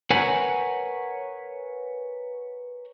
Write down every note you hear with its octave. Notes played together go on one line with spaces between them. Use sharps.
A#4 B4 C#5 F#5 G#5